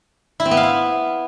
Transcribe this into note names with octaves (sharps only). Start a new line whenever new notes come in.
E4
C4
B3
F5
E4